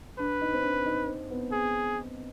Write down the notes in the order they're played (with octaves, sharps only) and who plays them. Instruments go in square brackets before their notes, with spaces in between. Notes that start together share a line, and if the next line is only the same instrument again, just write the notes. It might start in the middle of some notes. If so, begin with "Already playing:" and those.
[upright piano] D4 [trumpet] B4
[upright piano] D#4
C4
D4
D#4
C4
B3
[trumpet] G#4